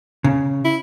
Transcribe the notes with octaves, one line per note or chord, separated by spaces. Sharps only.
C#3
E4